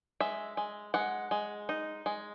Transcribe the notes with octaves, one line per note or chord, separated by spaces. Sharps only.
G#3 E5
G#3
G#3 F#5
G#3
D#4
G#3